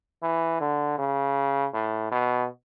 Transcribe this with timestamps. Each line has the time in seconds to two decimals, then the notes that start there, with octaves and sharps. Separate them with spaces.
0.23 E3
0.61 D3
0.99 C#3
1.74 A2
2.12 B2